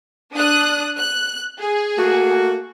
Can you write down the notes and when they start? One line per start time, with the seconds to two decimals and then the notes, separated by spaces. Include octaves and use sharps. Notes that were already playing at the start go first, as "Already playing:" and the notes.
0.33 D4 D#6 F#6
0.97 F#6
1.59 G#4
1.98 A3 A#3 F#4